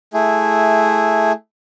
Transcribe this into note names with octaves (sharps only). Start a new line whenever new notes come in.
A3 E4 G#4